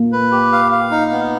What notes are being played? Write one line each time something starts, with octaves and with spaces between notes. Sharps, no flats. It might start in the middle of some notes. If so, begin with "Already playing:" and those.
Already playing: A#3
B4
G4
F5
F5
D#4
B3